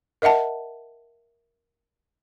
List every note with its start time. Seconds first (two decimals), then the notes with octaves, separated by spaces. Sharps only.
0.22 A#4 D#5 E5 F#5 A5